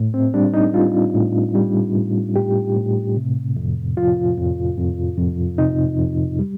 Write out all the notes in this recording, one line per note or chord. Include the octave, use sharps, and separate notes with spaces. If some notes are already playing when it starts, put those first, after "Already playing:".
Already playing: A2
C4
G3 D4
D#4
G3 F4
A2
G3
A2
A2 G4
A2
C3
F2
F3 F4
F2
F2
F2
C3 D#4
F2
G3